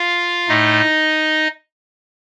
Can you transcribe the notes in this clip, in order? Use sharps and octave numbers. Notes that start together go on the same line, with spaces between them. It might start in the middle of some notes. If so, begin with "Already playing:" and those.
Already playing: F4 F5
A2 A3 D#4 D#5